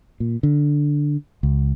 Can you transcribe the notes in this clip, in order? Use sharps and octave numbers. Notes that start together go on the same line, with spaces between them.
A#2
D3
C#2